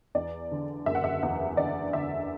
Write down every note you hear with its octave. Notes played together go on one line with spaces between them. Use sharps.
E2 D5
D3
F#1 E5
F#5
E5
E2 E5
D3 D5
D3 E5